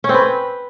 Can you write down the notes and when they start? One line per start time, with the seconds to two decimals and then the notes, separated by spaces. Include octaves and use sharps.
0.04 C#4
0.09 C4
0.14 B4